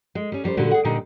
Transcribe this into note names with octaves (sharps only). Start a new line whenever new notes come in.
G#3
G3 C#4
F#2 G3 G#4 C5
A#2 D3 G3 F#4
G#4 F#5
A#2 D3 G3 D#4 G5